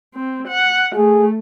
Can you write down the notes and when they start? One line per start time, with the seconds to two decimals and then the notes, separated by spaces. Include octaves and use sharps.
0.14 C4
0.48 F#5
0.95 A3 G#4